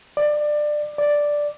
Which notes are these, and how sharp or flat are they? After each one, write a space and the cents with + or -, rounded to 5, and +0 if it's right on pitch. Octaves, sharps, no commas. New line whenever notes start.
D5 +20
D5 +0